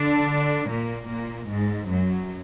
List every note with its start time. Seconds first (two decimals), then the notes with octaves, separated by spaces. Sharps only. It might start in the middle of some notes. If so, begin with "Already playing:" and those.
Already playing: D3 D4
0.69 A#2 A#3
1.08 A#2 A#3
1.49 G#2 G#3
1.89 F#2 F#3